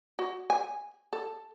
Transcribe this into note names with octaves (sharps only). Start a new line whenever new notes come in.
F#4
G#5
A4